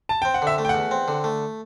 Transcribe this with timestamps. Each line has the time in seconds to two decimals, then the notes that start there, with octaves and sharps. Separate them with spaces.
0.09 A5
0.22 C4 G5
0.34 F#5
0.42 D3 E5
0.58 A3
0.65 G5
0.69 F#5
0.74 E2
0.91 C4
1.08 D3
1.24 A3